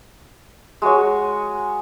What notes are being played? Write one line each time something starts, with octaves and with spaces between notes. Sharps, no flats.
G#3 F#4 C#5 C#6